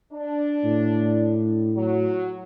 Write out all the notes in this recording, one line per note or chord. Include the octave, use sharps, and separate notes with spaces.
D4
A2
F#3